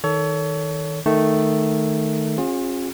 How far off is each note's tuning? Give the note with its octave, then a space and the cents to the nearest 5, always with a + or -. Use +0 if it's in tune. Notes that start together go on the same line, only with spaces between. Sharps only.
D#3 +15 A4 +0 C#5 +30
D#3 -5 A3 +0
C#4 -40 F4 +35 G#4 -15